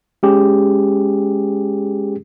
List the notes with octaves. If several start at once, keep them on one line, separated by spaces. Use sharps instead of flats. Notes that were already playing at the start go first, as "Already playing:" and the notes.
G#3 C#4 G4 G#4